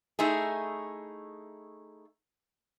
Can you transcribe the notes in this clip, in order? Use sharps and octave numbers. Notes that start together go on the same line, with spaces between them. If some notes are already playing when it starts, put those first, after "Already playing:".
A3 D#4 E4 G#4